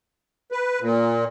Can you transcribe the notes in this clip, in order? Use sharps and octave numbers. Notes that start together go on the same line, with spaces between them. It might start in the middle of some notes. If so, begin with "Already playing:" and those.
B4
A#2